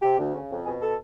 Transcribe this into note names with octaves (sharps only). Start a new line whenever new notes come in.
C3 G4
D2
C#3
F2
B2 G#4
A4